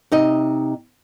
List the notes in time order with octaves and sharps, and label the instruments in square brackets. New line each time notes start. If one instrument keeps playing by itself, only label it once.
[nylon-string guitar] C3 D#4 D#5